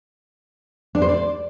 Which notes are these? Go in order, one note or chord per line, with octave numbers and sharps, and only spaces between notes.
D4
C5
D5